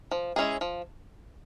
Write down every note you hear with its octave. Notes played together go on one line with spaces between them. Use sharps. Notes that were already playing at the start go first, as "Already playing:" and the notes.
F3
G#3 C#4 E4 G#4
F3